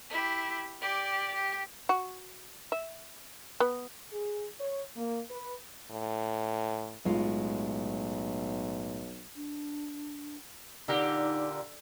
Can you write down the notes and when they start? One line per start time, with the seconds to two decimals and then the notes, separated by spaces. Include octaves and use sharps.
0.10 E4 G4
0.81 G4 D5
1.34 G4
1.89 F#4
2.72 E5
3.60 B3
4.12 G#4
4.61 C#5
4.97 A#3
5.31 B4
5.90 A2
7.05 B1 A2 G#3 F4
9.36 D4
10.88 A#2 D3 D#4 G4 A#4